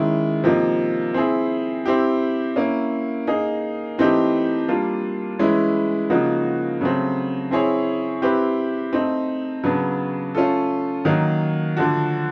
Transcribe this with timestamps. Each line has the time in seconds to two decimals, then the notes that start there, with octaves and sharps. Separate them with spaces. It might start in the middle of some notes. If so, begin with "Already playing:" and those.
Already playing: D#3 G#3 C#4 E4
0.44 C3 F3 A#3 D#4
1.14 C4 E4 G#4
1.86 C4 E4 G4
2.56 A#3 C#4 E4
3.27 A#3 D#4 G#4
3.98 E3 A3 C4 D#4 G4
4.68 G3 A#3 D4 F4
5.39 E3 G#3 C#4 E4
6.10 C#3 F3 A#3 D#4 F#4
6.81 C#3 F#3 A3 C4
7.51 C4 E4 G#4 C#5
8.22 C4 E4 G4 B4
8.93 A3 C4 D#4
9.64 C#3 F#3 B3 D4
10.35 A3 C#4 F4 A4
11.05 D#3 F#3 A#3 D#4
11.77 D3 F3 A3 D4 F#4